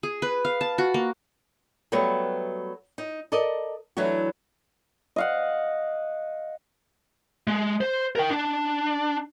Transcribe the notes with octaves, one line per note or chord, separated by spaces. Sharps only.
G#4
B4
F5
A5
F#4
A#3
F#3 G3 A3 B3 F#4 B4
D#4
A4 A#4 D5 D#5
E3 F#3 A3 D4 F#4
D#5 F5 F#5
G#3
C5
A#4 G5
D4